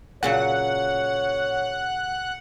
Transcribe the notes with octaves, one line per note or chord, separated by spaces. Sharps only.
A#2 C#3 F#3 C#5 F#5